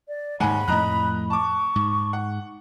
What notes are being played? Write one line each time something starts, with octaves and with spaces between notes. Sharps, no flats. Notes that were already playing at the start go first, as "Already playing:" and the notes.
D5
D#2 G#2 G#3 F#5 G#5 B5
F2 A2 D#5 A#5 F#6
A5 C#6 D6
G#2
F#5